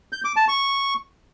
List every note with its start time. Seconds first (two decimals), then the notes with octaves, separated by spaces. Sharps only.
0.12 G6
0.24 D6
0.36 A5
0.48 C#6